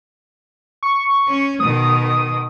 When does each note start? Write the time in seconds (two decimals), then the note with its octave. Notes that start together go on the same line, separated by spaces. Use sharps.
0.83 C#6
1.28 C#4
1.60 B2 D#3 D#6